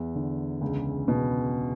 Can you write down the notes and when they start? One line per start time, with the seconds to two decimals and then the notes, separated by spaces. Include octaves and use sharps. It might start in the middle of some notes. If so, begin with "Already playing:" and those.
Already playing: E2
0.15 D3
0.61 C#2
1.08 B2